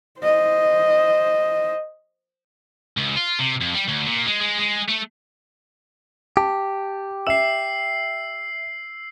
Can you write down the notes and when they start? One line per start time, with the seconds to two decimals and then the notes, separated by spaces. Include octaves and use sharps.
0.20 C5 D#5
2.97 C#2
3.16 F4
3.39 C3
3.61 F2
3.74 G3
3.88 D2
4.06 A#2
4.26 G#3
4.41 G#3
4.60 G#3
4.89 A3
6.37 G4 A5
7.27 E5 E6 C7 E7